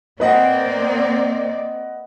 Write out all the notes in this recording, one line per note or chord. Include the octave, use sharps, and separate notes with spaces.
A#3 C4 B4 D5 D#5 F#5